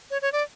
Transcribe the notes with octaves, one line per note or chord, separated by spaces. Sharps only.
C#5
C#5
D5